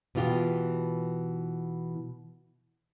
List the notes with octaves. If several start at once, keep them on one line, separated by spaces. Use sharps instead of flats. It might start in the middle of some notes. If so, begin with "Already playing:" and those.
B2 E3 B3 F4 G4